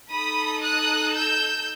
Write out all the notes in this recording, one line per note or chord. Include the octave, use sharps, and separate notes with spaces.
D#4 A4 B5 D#6
D#6 F#6
E6 G6